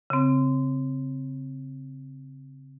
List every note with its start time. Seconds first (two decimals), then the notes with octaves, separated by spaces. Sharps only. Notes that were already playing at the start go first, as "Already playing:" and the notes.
0.10 C#3 C4